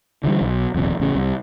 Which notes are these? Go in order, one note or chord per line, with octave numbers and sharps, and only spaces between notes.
D3 E3 F3 G3
B1
D#1 C2 F2
A1 C#3
C2